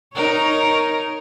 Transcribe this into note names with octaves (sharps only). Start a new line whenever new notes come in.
D#4 A#4 C#5